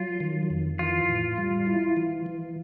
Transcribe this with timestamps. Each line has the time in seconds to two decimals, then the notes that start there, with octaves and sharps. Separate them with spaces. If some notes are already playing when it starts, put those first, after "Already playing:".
Already playing: F#3 F4
0.20 D#3
0.50 F2
0.79 E3 F4
1.09 A2
1.38 G3
1.67 E4
1.97 E3
2.26 E3